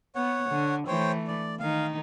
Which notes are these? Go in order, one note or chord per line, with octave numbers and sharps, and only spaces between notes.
B3 C#5 F#5
D3
E3 A3 C5 C#5 G5
D5
D#3 D#4 F5